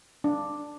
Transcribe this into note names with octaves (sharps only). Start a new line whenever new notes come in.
D4